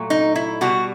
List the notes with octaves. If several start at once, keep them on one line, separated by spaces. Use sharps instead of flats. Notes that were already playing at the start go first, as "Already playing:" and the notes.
Already playing: A#2 F#3 A3
D#4
E4
B2 G3 F#4